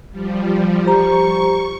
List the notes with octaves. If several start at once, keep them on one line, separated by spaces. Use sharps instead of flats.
F3 G3
G4 C5 A#5 C#6